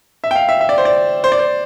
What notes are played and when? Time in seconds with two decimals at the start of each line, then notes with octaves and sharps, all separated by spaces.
0.24 E5
0.31 G5
0.36 F5
0.49 E5
0.61 E5
0.69 D5
0.78 C5
0.85 D5
1.24 C5
1.32 D5
1.39 C5